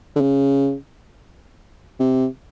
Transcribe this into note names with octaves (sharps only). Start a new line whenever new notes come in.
D3
C#3
C3